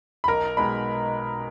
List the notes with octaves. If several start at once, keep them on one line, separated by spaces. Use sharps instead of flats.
B5
B1 A#4 A#5
B2 G#3 D#4 B5